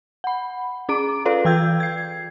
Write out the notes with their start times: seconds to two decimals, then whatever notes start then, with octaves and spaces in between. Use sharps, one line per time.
0.24 F#5 B5
0.89 C#4 G#4 A#5 D6 D7
1.25 F4 A4 B4 D5 F5
1.45 E3 G5 E6 G6 G#6
1.80 G#6 C7